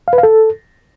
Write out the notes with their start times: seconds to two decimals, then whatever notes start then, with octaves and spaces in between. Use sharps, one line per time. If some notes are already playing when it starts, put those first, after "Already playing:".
0.08 F5
0.13 B4
0.18 F5
0.23 A4